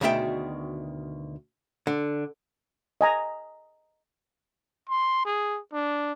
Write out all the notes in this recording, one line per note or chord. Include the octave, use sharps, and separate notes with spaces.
D2 B2 D#3 G#4 E5 G5
D3
D#5 G#5 A#5
C6
G#4
D4